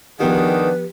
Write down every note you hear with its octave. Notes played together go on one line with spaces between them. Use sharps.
D#3 F3 B3 D4 G4 G#4 B4 F#5